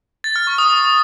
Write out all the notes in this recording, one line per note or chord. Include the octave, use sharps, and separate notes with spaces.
A6
F6
C#6
D#6